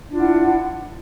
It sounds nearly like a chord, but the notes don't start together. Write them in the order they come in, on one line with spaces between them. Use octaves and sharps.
D4 F4 E4 F#5